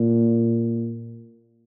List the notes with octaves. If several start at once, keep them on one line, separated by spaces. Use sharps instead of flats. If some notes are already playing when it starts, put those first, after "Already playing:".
Already playing: A#2